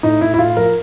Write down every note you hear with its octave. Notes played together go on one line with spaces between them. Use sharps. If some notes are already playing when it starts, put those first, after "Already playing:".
A2 D#4
A2 E4
E4
A2 F4
F3 A#4